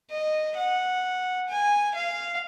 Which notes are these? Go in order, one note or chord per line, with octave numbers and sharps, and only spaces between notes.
D#5
F#5
G#5
F5